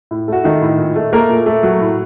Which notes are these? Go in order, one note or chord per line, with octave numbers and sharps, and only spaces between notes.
A2
A3 F#4
D#3 A3 D#4
A2
A#2
A3
A3 A#3 A#4
A#2
A3
F#3
A2